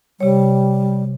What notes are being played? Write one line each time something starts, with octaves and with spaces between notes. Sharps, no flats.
C3 G3 C#5